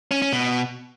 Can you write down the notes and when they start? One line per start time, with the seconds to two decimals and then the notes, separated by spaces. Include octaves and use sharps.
0.11 C#4
0.22 C#4
0.33 B2